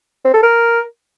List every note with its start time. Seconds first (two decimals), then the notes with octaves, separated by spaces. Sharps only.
0.25 C4
0.34 A4
0.43 A#4